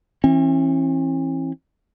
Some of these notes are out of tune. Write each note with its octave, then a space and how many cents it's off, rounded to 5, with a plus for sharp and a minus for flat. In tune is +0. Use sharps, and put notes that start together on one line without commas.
E3 +0 C#4 -45